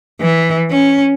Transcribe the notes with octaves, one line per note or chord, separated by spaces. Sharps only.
E3
C#4